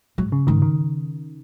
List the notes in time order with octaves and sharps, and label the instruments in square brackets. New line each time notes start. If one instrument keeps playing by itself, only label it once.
[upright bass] G#2 [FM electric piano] F#3
[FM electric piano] C#3
[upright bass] G#2 [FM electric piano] D#3
[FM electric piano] D#3